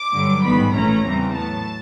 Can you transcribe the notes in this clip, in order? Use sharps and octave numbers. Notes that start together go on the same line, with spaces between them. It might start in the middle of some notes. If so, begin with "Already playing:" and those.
Already playing: D6
G2 D3 F#3
A1 G#2 D#3 G3 B3 B5
A#1 A2 E3 A3 C#4 A#5
E2 C#3 E3 G3 C4
A2 F#3 B3 A5